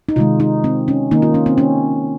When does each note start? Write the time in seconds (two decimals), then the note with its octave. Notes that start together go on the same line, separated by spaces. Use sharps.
0.09 D#4
0.16 C3 D#3 G#3 F4
0.40 D#4
0.64 C4
0.88 C#4
1.11 D#3 A#3 D#4
1.22 F4
1.34 C#4
1.46 C4
1.58 C#4